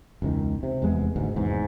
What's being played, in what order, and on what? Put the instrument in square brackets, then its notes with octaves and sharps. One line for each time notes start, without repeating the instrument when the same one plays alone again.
[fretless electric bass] E1 C#2 B2 D#3
C3
F1 E2 G#3 B3
G#1 D2 G#2
F1 E2 G#2